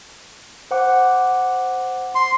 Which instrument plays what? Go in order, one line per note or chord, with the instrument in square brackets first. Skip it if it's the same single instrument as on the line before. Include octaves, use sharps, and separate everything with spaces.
[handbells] C5 F#5 D6
[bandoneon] C6